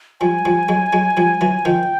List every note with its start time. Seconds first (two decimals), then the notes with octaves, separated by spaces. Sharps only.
0.21 F3 G3 G#5
0.45 F3 G3
0.69 F#3 G#3
0.93 F#3 G#3
1.17 F3 G3
1.41 E3 F#3
1.65 D#3 F3 G5